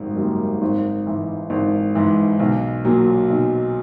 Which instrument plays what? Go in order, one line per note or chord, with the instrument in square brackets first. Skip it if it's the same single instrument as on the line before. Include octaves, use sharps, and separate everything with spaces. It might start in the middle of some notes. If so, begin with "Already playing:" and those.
Already playing: [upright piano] G#1 F#2 G3
F#2 D#3 G3 A#3
G#1
G#2 E3
G#1
G#2 E3
B1
A#2 F#3
B1